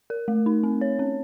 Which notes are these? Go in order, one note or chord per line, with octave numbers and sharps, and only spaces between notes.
A#4
A3
D#4
C4
C#5
C#4